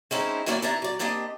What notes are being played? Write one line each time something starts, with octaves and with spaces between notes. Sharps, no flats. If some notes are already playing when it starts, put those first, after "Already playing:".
G#3 C4 C#4 D#4 E4
E3 F#3 A#3 C#4 E4 D5
D#2 E3 D4 E4 A5 A#5
F#3 D5
A#3 C4 D4 G4 D#5